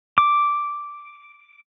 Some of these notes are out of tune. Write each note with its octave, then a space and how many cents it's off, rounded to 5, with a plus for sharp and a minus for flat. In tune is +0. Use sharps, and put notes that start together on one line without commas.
D6 -5